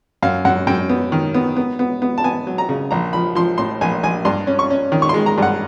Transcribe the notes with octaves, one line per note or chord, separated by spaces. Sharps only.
F#2 F5
F#2 F#5
F#2 G5
B3
D#3
B3
B3
B3
B3
A5
B3 G#5
F#3
A#5
C#3
A#1 A#5
F3 B5
F3 C6
A2 C6
A#1 G#5
A#1 G#5
G2 C6
C#4
C#6
C#4
D#3
C#6
G#3 C6
A#5
G2 F#5